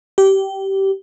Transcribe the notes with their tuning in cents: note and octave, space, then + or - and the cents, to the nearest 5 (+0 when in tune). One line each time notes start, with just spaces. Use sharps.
G4 -20